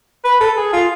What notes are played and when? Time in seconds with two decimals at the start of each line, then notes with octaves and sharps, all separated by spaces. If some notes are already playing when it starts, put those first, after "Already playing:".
0.25 B4
0.41 A4
0.57 G#4
0.73 F4